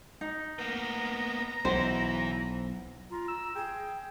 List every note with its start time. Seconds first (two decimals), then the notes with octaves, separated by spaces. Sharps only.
0.21 D#4
0.59 A#3 B3 A#5
1.65 B1 E3 C5
3.11 F4 A#5
3.28 E6
3.55 G#4 G5